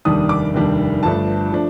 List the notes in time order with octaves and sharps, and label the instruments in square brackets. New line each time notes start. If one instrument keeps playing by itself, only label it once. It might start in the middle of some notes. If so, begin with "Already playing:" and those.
[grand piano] F1 D#2 D#3 G3 D4 D#6
D6
F1 D#2 D#3 G3 D4
G1 G2 F3 A3 D4 A5
F3 A3 D4